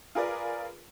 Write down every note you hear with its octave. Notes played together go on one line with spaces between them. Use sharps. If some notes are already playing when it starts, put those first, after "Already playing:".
F4 G#4 A#4 B4 D5